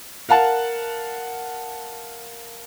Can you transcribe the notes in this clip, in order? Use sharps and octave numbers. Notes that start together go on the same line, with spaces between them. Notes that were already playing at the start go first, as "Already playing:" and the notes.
A#4 F5 F#5 A5